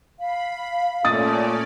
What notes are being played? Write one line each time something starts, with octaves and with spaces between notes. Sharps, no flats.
F5 B5
A#2 A3 C#4 D5 D#6 A6